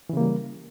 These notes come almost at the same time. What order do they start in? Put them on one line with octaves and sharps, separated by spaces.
E3 C#3 A#3 G3